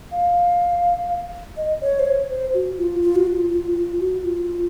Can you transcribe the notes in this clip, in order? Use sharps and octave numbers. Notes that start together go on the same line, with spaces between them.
F5
D#5
C#5
C5
C#5
C5
F#4
F4
F4
F#4
F4
F4
F4
F#4
F4